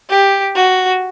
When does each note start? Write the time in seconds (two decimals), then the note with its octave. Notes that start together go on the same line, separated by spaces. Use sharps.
0.10 G4
0.56 F#4